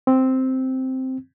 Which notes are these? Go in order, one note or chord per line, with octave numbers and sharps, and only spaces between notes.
C4